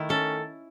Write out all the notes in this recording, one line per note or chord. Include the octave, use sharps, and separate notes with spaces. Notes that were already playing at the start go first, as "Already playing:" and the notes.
Already playing: D#3 A3 E4
C#4 A4